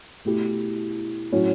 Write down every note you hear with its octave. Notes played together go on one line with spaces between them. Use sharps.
B2 A3 E4 G4
A2 F#3 C#4